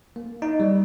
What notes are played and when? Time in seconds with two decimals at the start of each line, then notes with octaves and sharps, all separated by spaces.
0.16 A#3
0.42 D#4
0.60 G3